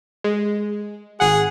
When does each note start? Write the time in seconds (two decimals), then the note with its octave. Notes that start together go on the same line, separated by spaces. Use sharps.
0.24 G#3
1.20 G#1 G#4 F#5